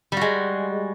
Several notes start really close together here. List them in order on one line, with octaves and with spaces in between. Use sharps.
G3 F#4 G#3